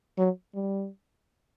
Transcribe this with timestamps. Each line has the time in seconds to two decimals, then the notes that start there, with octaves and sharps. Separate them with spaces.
0.18 F#3
0.55 G3